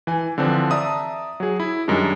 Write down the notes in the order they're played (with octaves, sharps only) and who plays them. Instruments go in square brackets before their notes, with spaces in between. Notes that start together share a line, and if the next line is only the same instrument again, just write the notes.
[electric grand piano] E3 G#5
D3 E3 F3 C4 D4
D5 E5 A5 A#5 D#6
F#3 G#4
E4
F#2 D#3 G3 G#3 D4